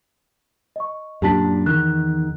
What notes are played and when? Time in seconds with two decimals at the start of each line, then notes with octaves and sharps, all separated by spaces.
0.76 D#5 C#6
1.22 F#2 A#2 D4 G4 A5 B6
1.66 E2 D#3 F#6